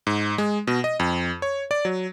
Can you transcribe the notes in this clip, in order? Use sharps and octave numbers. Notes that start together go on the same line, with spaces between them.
G#2
G#3
B2
D#5
F2
C#5
D5
F#3